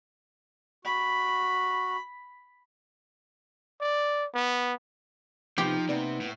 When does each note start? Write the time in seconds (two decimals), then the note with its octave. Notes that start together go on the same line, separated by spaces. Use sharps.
0.85 F#4 B5
3.81 D5
4.34 B3
5.58 C3 F3 B3 D#4 G4 C6
5.89 C3 A#3 B3 D5
6.21 A2